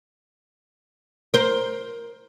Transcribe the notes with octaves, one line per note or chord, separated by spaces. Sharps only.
A#4 C5